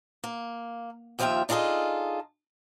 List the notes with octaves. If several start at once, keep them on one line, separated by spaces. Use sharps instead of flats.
A#3
D#2 F3 E4 F4 E5 G5
D4 D#4 F4 G#4 A4 D#5